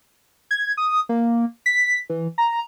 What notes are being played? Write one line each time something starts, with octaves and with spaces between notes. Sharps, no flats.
G#6
D#6
A#3
B6
E3
A#5